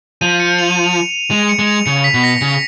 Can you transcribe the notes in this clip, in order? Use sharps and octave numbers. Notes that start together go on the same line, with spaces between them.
F3 D#7
C#7
F7
D#7
F7
G#3 F7
C#7
G#3
F7
C#3 C#7
B6
B2
A#6
C#3 C#7